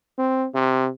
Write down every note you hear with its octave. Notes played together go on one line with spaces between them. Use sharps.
C4
C3